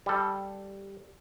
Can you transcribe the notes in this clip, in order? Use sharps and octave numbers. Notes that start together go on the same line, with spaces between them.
G3 A4